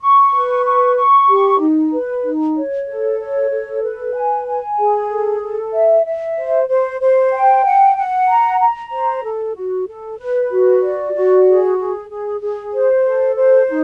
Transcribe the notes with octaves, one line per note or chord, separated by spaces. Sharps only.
C#6
B4
C#6
C#6
G4
D#4
B4
D#4
C#5
A4
C#5
A4
B4
G#5
G#5
G#4
A4
A4
E5
E5
C5
C5
C5
G5
F#5
F#5
A#5
A#5
C5
A4
F#4
A4
B4
F#4
D5
F#4
G#4
G#4
G#4
G#4
C5
A4
C5
D#4